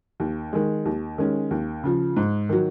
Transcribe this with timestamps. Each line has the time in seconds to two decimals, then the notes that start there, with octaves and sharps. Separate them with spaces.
0.20 D#2
0.53 D#3 G#3
0.85 D#2
1.18 D#3 G#3 C#4
1.51 D#2
1.84 C#3 F3
2.17 G#2
2.49 D#3 F#3